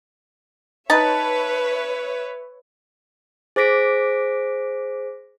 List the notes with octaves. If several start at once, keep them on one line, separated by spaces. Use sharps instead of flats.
D#4 B4 C#5 E5 A5
G#4 C5 D6 A#6 B6 D7